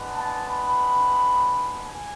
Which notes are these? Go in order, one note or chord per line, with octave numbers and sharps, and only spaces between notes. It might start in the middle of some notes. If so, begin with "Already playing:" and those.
Already playing: G#3 B3 D4
A5
B5
G#5